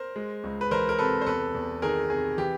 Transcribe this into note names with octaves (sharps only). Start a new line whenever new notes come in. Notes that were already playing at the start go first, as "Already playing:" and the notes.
Already playing: A#4 C5
G#3
C#2
B4
E3 A#4 C5
A#4
C3 A4 B4
C5
E2 A4 B4
E2
D#3 G#4 A#4
C3 G#4
E3 G4